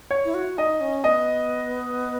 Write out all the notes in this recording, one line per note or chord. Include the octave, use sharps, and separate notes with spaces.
C#5
E4
F#4
D#4 D#5
C#4
B3 D#5